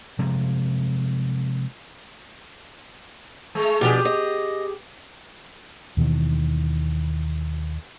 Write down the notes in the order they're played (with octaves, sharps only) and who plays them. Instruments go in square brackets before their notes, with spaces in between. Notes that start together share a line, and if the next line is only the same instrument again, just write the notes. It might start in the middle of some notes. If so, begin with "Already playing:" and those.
[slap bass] C3 F3 G#3
[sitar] G#3 A3
[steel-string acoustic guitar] B2 F3 D4 [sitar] G4 G#4
[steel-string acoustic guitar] D#5
[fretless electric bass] D#2 B2 D#3 E3